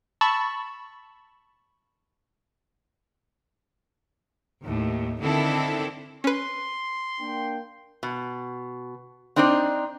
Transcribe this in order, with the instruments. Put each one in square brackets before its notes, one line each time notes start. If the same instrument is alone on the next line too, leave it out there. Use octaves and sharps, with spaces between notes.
[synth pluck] A5 B5 C#6 E6 A6
[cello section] D#2 A2
D3 D#3 C4 D4 E4 A4
[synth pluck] C#4 B4 [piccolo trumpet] C6
[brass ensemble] A#3 D4 G5
[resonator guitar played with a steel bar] B2
C4 D4 D#4 C5 D5